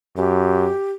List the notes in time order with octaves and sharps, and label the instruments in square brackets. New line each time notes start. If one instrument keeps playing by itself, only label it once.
[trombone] F#2 [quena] G4